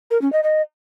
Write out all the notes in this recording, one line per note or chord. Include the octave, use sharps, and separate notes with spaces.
A#4
C#4
D#5
D#5